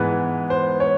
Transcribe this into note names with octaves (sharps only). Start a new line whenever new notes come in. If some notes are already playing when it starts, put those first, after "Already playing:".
Already playing: G#2 E3 G#3 B3 B4
C5
C#5